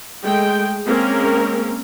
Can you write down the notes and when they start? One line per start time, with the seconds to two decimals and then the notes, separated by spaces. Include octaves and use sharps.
0.22 G#3 A3 G5
0.85 G#3 A#3 C4 C#4 A#4